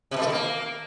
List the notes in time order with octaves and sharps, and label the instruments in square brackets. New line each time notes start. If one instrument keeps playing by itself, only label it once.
[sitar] C3
B2
A3
D#3
A#3